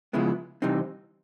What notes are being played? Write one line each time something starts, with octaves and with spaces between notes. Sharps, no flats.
C#3 F3 G#3 B3 E4
C3 E3 G3 C4 D#4